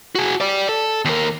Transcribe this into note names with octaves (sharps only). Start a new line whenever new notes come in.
F#4 G#4
G4 D5
A4
D#2 A#4